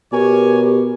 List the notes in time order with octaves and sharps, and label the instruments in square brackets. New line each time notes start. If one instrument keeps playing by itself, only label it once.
[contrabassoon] B2 [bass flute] G4 [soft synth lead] A#4 [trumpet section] C#5 G#5